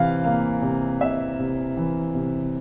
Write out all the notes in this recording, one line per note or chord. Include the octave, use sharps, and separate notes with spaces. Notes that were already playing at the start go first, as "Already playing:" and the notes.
Already playing: C3 E3 F5
A#3 F5
C3
C3 E5
C3
E3
C3